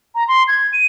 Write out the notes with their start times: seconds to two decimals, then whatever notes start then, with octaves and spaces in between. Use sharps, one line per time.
0.15 A#5
0.28 C6
0.48 G#6
0.73 D#7